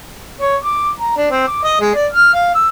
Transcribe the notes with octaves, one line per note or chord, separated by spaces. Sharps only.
C#5
D6
A#5
D4
C4
D6
D#5
G#3
D5
F6
F5
E6